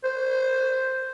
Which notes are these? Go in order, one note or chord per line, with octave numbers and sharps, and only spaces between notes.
C5